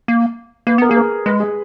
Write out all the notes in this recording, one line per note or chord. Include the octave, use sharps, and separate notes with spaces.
A#3
A#3 B4
B3 A#4
A#3 G#4
A#4
G#3 B4
G#4